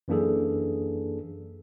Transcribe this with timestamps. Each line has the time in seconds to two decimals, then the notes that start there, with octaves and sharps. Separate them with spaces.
0.08 F#2 E3 A#3 D4 G#4 A4